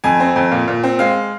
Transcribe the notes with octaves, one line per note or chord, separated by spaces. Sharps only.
F2 G#5
C4
F2
A#2
A#2
C4
G#3 F5